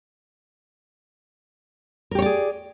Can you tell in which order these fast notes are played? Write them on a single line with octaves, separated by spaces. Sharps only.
A#4 G4 C#5 D5 G#4